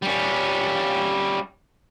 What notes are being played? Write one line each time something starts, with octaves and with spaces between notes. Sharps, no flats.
G3 C#4